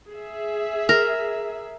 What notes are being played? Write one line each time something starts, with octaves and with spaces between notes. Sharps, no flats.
G#4 E5
A#4